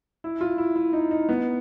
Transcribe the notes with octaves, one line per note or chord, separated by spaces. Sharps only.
E4
F4
E4
E4
D#4
D#4
B3